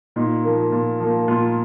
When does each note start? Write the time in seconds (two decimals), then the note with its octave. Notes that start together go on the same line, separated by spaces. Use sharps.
0.16 A#2 D#4
0.44 F3 A#3
0.72 A#2
1.00 F3 A#3
1.28 A#2 F4